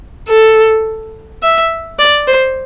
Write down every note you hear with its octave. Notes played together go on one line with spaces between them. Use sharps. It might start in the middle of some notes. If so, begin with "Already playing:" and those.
A4
E5
D5
C5